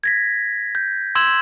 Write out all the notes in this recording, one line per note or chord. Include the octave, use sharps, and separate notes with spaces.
G#6 A#6 B6
G6
C6 E6 G#6 E7 F#7